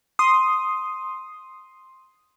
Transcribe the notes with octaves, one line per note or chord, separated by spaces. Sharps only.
C6 D#6